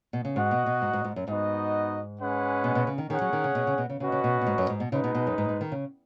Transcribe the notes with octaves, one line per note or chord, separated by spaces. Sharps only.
B2
C#3
G#2 F#4 D#5 F#5
B2
B2
G#2
G#2
G#2
F#2
G#2 B3 D#4 F#4 D#5
G#3 C#4 B4 F#5
B2
B2
C#3
D#3
D#3 C#4 G#4 C#5 F#5
F#3
D#3
C#3
B2
C#3
B2
C#3
C#3 C#4 F#4 B4 D#5
C#3
B2
B2
G#2
F#2
G#2
B2
C#3 G#3 D#4 B4
B2
B2
F#2
G#2
G#2
D#3
C#3